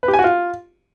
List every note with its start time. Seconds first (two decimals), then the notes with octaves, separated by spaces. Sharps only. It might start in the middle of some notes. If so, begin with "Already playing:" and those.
0.03 B4
0.08 G4
0.13 G#5
0.19 F#4
0.24 F4